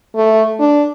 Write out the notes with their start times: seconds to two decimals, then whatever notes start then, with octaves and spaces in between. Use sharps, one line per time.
0.16 A3
0.60 D4